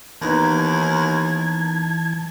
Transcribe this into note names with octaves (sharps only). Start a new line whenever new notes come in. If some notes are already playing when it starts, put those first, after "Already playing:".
D#2 E3 A#3 B3 D#4 A5 G#6